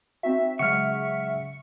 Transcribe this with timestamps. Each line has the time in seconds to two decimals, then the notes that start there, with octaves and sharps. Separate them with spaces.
0.23 C4 D#4 F#4 E5
0.59 C#3 F#3 G#3 F#5 C#6 F6